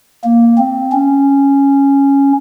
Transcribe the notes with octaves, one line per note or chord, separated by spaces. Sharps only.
A#3
C4
C#4